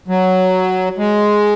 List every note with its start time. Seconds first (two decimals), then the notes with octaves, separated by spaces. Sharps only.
0.08 F#3
0.98 G#3